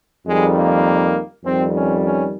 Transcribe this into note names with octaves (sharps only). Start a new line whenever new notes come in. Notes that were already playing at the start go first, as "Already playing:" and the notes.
F2 D#3 G3 G#3
A#3
F2 D#3 G3 C4
C#4
C#4